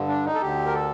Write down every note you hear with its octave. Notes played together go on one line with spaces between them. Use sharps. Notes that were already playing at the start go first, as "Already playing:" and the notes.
Already playing: G2 D3
D4
D#4
A4
D2 D3 G4
A#4
A4